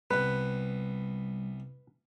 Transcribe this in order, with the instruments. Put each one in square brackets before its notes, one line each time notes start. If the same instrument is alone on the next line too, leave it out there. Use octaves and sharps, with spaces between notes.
[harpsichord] C2 B3 [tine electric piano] G3 [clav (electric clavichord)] B4